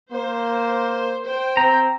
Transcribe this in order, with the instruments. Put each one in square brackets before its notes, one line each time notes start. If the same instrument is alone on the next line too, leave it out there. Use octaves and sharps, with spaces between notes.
[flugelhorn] A#3 [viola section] C5
[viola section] C5 G5
[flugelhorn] C4 [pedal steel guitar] A#5